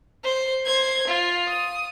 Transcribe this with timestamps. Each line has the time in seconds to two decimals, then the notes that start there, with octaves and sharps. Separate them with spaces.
0.24 C5
0.66 C5 G#6
1.07 F4
1.48 D#6